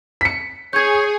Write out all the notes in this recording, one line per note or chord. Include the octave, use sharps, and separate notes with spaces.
B6 C#7
G#4 C#5 G6 G#6